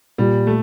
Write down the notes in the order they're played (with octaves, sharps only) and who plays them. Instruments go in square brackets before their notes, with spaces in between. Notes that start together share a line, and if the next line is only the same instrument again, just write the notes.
[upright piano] A#2 [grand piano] G3
[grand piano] A3